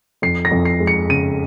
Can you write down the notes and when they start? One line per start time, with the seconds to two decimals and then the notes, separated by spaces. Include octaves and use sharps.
0.22 F2 C7
0.45 A#6
0.51 F2
0.65 C7
0.80 G#3
0.87 C#7
1.09 C#3 D#7